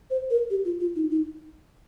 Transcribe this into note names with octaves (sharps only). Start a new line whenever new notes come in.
C5
A#4
G4
F4
F4
D#4
D#4